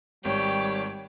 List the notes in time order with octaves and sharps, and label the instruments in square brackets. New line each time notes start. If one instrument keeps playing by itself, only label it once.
[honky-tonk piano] G#1 [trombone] G3 [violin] G4 [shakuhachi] C#5